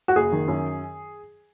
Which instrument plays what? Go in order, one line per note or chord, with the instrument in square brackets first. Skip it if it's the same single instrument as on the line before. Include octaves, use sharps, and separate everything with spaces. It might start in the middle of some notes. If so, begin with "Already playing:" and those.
[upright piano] F#4
F#1 G#4
D#3
F#2